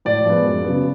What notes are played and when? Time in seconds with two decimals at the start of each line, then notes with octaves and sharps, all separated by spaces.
0.05 A2 D5
0.25 F3 G#3 B3
0.45 F#2
0.64 C#3 F#3 B3